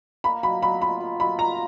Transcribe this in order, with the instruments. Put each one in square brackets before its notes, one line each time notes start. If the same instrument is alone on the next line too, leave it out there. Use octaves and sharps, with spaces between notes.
[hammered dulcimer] A#3 [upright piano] B5
[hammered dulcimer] F#3 [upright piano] B5
[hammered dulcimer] F#3 [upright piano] B5
[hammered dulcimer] F4 [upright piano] B5
[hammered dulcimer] F4
[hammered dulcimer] F#3 [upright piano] B5
[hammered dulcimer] F4 [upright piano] A#5